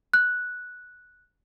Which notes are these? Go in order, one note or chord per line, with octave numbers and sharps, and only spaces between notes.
F#6